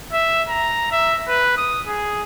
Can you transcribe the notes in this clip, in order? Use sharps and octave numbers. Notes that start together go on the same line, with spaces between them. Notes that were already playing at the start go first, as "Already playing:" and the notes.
E5
A#5
E5
B4
D#6
G#4